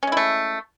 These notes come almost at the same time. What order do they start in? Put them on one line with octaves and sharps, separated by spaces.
C#4 G#3 E4 A3